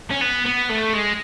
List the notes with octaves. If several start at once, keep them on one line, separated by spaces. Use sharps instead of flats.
C#4
B3
B3
A3
G#3